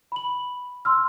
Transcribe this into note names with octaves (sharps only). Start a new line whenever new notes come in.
B5 F#7
C6 E6 F6